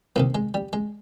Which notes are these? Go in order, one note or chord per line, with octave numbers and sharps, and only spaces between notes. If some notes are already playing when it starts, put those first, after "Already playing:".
C2 C3 D#3 A#3
G#3
G3
G#3